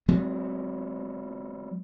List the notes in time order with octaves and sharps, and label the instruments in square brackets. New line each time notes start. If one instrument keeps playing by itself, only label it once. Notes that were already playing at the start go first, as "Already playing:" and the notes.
[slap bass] F#3 G#3 B3 C4